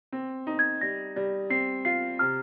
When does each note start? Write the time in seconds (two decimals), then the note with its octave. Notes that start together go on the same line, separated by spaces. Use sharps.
0.12 C4
0.47 D#4
0.59 G#6
0.81 G3 A#6
1.16 G3
1.50 C4 C7
1.85 F4 C7
2.19 C3 F6